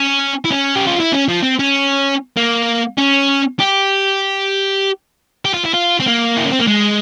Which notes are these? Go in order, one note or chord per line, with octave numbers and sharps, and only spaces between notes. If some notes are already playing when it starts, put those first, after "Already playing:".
Already playing: C#4
E4
C#4
G4
F4
E4
C#4
F3
C4
C#4
A#3
C#4
G4
G4
F4
E4
F4
C4
A#3
E4
C#4
C4
A#3
G#3